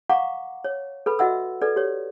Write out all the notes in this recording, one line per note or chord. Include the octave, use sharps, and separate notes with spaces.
F5 F#5 A#5 C#6 D6
C#5
A4 B4 B5
F#4 D#5 E5 F#5 E6
A4 B4 D5
G4 C#5